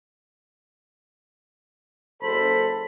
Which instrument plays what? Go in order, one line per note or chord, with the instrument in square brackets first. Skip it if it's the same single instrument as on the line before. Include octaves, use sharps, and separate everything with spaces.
[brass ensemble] F#1 A4 C5 [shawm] B5